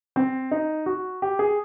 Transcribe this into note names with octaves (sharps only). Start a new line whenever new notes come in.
C4
D#4
F#4
G4
G#4